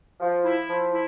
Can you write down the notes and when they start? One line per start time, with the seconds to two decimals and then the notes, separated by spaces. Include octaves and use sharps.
0.21 F3
0.45 E4
0.69 F3
0.93 E4